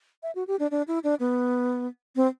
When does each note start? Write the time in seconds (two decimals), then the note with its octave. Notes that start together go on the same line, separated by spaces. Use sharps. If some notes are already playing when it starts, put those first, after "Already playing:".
0.23 E5
0.35 F#4
0.47 G4
0.59 D4
0.71 D4
0.88 E4
1.04 D4
1.20 B3
2.16 C4